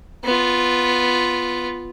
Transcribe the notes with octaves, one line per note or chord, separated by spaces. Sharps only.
B3 F4